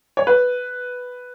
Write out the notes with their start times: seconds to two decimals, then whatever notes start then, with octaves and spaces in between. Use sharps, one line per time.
0.17 C#5
0.27 B4